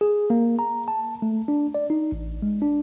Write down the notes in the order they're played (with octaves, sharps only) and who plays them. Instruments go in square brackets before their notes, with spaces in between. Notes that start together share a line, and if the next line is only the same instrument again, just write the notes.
[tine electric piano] G#4
A#3
A#5
A5
A3
D4
D5
D#4
A1
G#3
D4